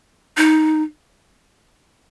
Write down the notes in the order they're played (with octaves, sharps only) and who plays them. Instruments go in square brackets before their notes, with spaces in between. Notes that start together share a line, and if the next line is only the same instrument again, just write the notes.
[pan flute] D#4